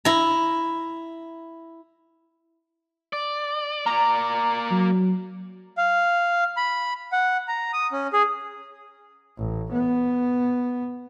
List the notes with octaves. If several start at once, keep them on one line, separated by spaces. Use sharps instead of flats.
E4 A#5
D5
A#3 D5 A#5
F#3
F5
B5
F#5
A#5
D#6
C#4
G#4
A1
B3